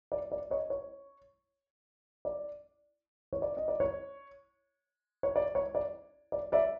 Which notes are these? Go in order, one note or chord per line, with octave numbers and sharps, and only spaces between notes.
D5
D5
C#5 D#5
C#5
D5
C#5
D5
D#5
D5
C#5
C#5
D5
C#5
D5
D5
D5 E5